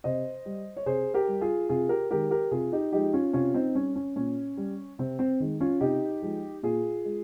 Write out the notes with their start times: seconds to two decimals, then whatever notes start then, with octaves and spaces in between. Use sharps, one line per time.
0.04 C3 C5 D#5
0.45 G3
0.77 C#5
0.86 C3 G#4 C5
1.14 G4 A#4
1.28 G3
1.41 F4 G#4
1.69 C3 F4 G#4
1.89 G4 A#4
2.10 D#3 G#3 G4 A#4
2.30 G4 A#4
2.51 C3 F4 G#4
2.72 D#4 G4
2.92 F3 G#3 D#4 G4
3.13 C#4 F4
3.33 C3 C#4 F4
3.54 C4 D#4
3.75 G3 C#4
3.96 C#4
4.16 A#2 C#4
4.57 G3
4.99 C3 C4
5.19 C4
5.40 D#3 G#3
5.60 C#4 F4
5.80 C3 D#4 G4
6.22 F3 G#3
6.63 A#2 F4 G#4
7.05 G#3